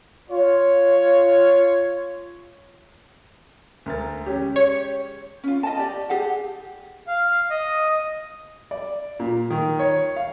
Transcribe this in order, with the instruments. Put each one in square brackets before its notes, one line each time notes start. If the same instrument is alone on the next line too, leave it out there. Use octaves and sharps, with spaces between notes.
[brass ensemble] F4 C#5
[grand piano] D2 A#4 A6
G#3 C#4 G4
[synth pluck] C#5 C#7
[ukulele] C#4 F4
D#5 A5
G4 D5
G4 G#4 F#5
[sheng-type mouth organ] F5
D#5
[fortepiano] D5
A#2
D#3
C#5
F5